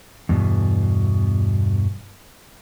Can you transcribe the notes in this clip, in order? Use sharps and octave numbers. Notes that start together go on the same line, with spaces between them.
E2 G2 B2